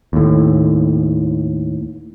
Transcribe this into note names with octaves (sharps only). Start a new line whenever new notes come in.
D#2 A2